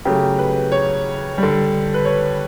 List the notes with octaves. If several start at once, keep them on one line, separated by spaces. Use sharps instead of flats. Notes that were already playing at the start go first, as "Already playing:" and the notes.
C#3 F#3 A3 G4
B4
C#5
D3 G3
B4
C#5